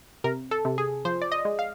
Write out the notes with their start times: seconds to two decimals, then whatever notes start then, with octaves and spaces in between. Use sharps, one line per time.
0.24 C3 A#4
0.51 A4
0.65 C3
0.78 G#4
1.05 F3 C5
1.22 D5
1.32 D#5
1.45 G#3
1.59 F5